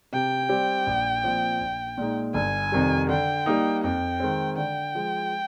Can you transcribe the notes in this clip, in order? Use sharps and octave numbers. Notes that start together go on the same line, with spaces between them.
C3 G5
G3 C4 G4
A#1
A#2 F3 C4
A#1
A#2 G#3 D#4
G1 G#5
F2 C3 D#3 G3
D3 G5
G3 A#3 D#4
F2 G5
D#3 G#3 C4
D3 G5
F3 G#3